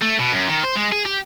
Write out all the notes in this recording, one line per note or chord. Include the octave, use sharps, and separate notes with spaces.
A3
B2
F#2
D#3
C5
G#3
G#4
G4